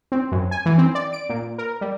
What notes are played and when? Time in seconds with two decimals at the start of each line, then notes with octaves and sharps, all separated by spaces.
0.12 C4
0.32 F#2
0.51 G#5
0.66 E3
0.78 C4
0.95 D5
1.13 D7
1.29 A#2
1.58 A#4
1.81 G3